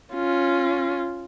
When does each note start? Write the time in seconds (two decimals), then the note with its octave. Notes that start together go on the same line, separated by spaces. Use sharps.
0.14 C#4 F4